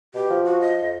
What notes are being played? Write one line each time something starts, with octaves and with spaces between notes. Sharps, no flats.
B2 G4
F3
F#4
D#5
F2